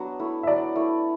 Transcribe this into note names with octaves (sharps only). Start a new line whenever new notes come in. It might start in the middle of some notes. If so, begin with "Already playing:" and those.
Already playing: F#3 B3 D4
A3 E4
E5
F#3 D5
A3 E4